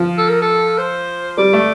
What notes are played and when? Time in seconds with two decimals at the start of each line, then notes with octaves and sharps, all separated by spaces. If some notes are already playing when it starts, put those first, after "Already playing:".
Already playing: F3
0.18 A4
0.29 A#4
0.42 A4
0.78 C5
1.37 G3 D5
1.53 A3